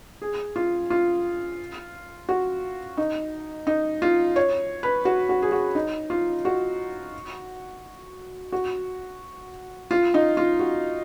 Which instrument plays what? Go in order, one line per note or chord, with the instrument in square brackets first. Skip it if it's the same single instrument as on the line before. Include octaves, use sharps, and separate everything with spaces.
[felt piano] G#4
F4
F4
F#4
D#4
D#4
F4
C#5
B4
F#4
F#4
G#4
F#4
D#4
F4
F#4
F#4
F4
D#4
F4
F#4